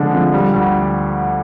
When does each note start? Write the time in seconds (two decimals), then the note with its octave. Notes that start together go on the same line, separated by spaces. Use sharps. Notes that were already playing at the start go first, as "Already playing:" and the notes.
Already playing: D3 F3 G#3 D4
0.14 F3
0.33 G3
0.53 D2